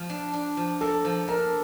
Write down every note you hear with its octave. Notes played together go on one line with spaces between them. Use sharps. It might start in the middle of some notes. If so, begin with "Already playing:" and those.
Already playing: F3
D4
D4
F3
A#3 A4
F3
D4 A#4